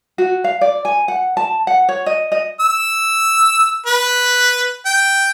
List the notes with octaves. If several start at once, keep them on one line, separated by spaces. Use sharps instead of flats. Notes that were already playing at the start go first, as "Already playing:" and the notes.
F#4
F5
D5
G#5
F#5
A5
F#5
C#5
D#5
D#5
E6
B4
G5